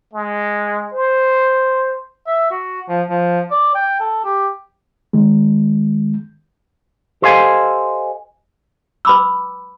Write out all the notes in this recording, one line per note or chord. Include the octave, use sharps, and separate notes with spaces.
G#3
C5
E5
F#4
F3
F3
D5
G5
A4
G4
D#3 G#3
G4 A4 C5 D#5 F5 G#5
B4 G5 B5 D6 E6